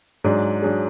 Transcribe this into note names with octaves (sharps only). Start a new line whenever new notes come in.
G#2 F#3 D4 G#4
F#3 D4 G#4